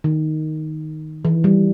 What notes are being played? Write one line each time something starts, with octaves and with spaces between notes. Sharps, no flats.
D#3
E3
G3